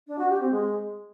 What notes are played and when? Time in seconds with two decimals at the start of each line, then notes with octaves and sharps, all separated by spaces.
0.07 D4
0.18 F#4
0.29 G4
0.40 C4
0.51 G#3